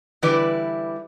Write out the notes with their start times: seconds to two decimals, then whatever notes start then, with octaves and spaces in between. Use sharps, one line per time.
0.22 D3 E3 G3 E4 B4 D5